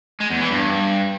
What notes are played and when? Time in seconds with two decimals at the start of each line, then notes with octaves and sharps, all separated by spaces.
0.20 G#3
0.30 E2
0.40 E3
0.51 G2